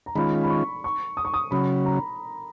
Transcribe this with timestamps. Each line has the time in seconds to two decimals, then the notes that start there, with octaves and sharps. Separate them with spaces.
0.06 A#5
0.15 D#3 G#3 C#4 F4 B5
0.43 B5
0.50 C#6
0.84 C#6
1.17 D#6
1.25 C#6
1.34 D#6
1.51 C#3 F#3 C#4 B5
1.85 A#5